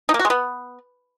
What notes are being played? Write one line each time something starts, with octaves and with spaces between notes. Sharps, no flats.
D#4
A#3
F#4
G#3
B3